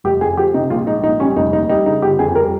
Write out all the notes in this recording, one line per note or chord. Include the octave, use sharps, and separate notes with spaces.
F1 G4
F2 G#4
F3 G4
C3 D#4
A#1 F4
G#2 D#4
A#1 D#4
G3 C#4
F1 D#4
D#2 D#4
G3 D#4
C#3 D#4
G1 G4
F2 G#4
G3 A#4